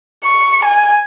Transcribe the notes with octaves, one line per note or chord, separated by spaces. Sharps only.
C#6
G#5